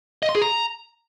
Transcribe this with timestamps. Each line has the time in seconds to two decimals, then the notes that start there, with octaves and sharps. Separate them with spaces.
0.23 D#5
0.29 C6
0.35 G#4
0.42 A#5